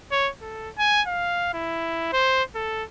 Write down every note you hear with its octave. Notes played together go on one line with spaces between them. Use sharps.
C#5
A4
G#5
F5
E4
C5
A4